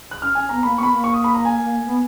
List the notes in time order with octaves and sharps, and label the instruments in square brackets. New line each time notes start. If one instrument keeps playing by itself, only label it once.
[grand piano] F#6
[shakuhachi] C#4 [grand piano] F6
[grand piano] G#5
[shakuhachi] B3 [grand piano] A#5
[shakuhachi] A#3 [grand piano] B5
[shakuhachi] B3 [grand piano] C#6
[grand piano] B5
[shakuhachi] A#3
[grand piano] C#6
D#6
B5
A#5
G#5
[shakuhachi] B3